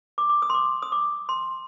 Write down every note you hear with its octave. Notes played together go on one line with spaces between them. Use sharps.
D6
D6
D#6
C6
D6
D#6
D6
C6